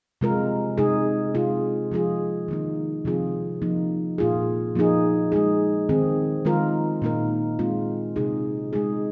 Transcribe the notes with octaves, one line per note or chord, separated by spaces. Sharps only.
C3 G#3 F4 A#4
C3 G#3 D#4 G#4
C3 G#3 F4 G#4
F3 G#3 F4 G#4
D#3 A#3 D#4
C3 F3 C4 F4 G#4
F3 A#3 D#4
A#2 A#3 F4 G#4
F3 A#3 D#4 G#4
G#3 D#4 G#4
D#3 C4 G#4
D#3 G#3 F4 A#4
A#2 A#3 D#4 A#4
G#3 C4 F4
C3 G#3 D#4 G#4
G#3 D#4 G#4